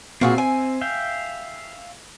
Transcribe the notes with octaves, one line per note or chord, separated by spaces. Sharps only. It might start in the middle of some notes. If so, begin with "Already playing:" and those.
A#2 C4 F#4 G#4 E5
G#5
E5 F5 G5